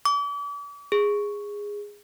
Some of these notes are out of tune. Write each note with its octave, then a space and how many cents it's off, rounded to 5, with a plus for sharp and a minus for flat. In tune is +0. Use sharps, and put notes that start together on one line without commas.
D6 -40
G#4 -15